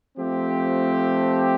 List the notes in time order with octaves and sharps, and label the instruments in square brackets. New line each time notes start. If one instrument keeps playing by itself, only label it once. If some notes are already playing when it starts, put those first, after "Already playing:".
[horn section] F3 A3 C4 G4